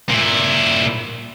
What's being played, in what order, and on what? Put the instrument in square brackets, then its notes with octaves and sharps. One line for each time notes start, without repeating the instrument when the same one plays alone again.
[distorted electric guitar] A#2 E4